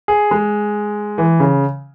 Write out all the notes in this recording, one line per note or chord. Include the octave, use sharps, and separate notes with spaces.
G#4
G#3
E3
C#3